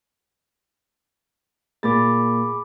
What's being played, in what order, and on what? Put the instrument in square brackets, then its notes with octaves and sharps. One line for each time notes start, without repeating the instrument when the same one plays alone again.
[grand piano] A#2 A6 [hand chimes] G#4 B5 D6